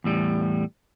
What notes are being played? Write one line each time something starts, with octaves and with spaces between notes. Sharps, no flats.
E2 A2 G3